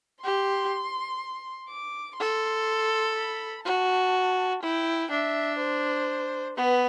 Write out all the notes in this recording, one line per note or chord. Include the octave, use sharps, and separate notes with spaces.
G4 C6
D6
A4 C6
B5
F#4 A5
E4 G5
D4 E5
C5
B3 B4